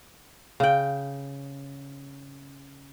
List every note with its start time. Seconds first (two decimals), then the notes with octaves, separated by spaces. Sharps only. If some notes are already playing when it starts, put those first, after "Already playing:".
0.60 C#3 G5